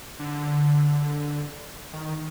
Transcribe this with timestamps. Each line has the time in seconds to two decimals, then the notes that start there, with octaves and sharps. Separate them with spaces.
0.19 D3
1.93 D#3